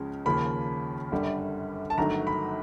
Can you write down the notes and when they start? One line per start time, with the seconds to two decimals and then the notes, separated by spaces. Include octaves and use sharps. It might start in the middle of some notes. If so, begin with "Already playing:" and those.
Already playing: C#2 C#3 F3 G#3 C#4
0.25 D#2 C#3 F3 A#3 B5
1.12 G1 F#2 D3 G3
1.90 A5
1.98 G1 G2 D#3 F#3 A3 A#5
2.27 B5